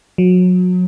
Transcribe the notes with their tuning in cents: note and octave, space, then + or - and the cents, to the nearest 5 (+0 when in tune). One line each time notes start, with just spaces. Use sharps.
F#3 -30